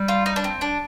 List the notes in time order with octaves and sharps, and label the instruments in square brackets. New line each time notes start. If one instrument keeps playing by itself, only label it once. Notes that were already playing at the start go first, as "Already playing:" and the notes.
Already playing: [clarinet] G3
[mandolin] F4
D#4
D4
C4
D4